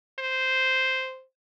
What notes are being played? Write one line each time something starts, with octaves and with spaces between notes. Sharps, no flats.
C5